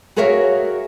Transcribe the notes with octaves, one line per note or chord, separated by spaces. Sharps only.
F#4 G#4 A#4 C#5 E5 F5